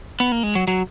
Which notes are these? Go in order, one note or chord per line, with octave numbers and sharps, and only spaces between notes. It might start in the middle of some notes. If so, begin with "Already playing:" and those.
B3
A#3
G#3
F#3
F#3